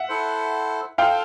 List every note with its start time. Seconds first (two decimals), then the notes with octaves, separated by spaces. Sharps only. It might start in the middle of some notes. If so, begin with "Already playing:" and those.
Already playing: E5 F#5
0.09 E4 A4 C5
0.98 F4 A4 C5 F5 G5